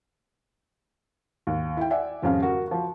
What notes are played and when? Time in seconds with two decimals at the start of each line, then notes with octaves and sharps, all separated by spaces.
1.47 D#2
1.77 E4 G5
1.90 D5 E5 F#5 G#5
2.22 D#1 F2 C#3 C#4 F5
2.43 F#4 A#4
2.68 F3 F#4